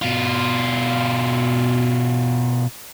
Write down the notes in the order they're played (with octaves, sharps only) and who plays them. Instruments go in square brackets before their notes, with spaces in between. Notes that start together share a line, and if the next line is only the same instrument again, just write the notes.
[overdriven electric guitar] B2 F4